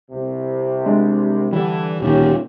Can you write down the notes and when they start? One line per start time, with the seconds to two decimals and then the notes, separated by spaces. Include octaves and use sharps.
0.11 C2 C3
0.86 G#3 D4
1.53 D3 E3 G3
2.00 D1 A#2 D#3 C#4 G4